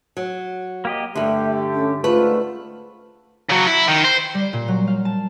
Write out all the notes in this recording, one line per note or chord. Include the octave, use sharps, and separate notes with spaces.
F#3
A#3 G4 D#5
G2 D3 G3 A3 G4 E5
C#4
G#2 D3 A3 F4 B4
C#3 F#3
E4
D#3
C5
G3
A#2
F#3
F5
A5